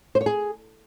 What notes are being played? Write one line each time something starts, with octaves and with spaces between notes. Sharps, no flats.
C5
C#5
G#4